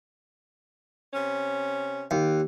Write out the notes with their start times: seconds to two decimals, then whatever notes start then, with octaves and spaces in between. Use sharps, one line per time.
1.14 C3 C#4
2.11 D#2